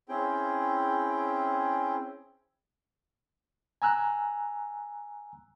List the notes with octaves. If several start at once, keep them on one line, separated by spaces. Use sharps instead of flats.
C4 C#4 E4 G#4 G5
G#5 A#5 E6 F#6